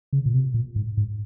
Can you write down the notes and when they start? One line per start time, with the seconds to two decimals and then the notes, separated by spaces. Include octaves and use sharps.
0.13 C#3
0.26 A#2
0.34 C3
0.54 A#2
0.76 G#2
0.97 G#2